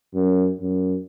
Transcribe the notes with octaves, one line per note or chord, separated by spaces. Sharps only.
F#2
F#2